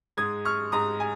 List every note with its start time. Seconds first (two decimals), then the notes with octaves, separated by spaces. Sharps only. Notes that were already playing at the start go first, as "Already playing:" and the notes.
0.17 G#2 G#3 D#6 G#6
0.45 C#6 F6
0.72 G#2 G#3 A#5 D#6
1.00 G#5